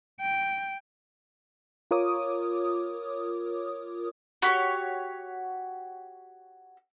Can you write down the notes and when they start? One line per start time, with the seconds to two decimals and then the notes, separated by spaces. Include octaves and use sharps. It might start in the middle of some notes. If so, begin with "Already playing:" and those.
0.20 G5
1.91 F4 A#4 C#5 D6 D#6
4.42 F#4 G4 C#5